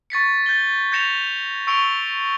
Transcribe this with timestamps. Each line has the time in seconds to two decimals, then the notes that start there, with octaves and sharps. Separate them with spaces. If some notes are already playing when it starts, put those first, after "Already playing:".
0.10 C#6 A6 B6 C#7
0.46 G6 A6 G7
0.92 G6 G#6 A#6 C#7 E7 F7
1.67 C#6 E6 C#7 D7 F7 G7